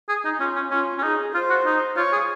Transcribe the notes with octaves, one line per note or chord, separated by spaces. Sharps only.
G#4
D#4
C#4 F4
C#4
C#4 F4
C#4
D#4 G#4
F4 C5
F#4
D#4
F4 C#5
G#4